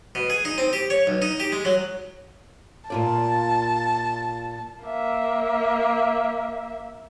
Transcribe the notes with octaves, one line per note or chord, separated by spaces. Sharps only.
B2
G#4
D#4
C4
G4
C#5
B1
D#4
G4
G#3
F#3
A#2 F4 D5 A5
A#3 E5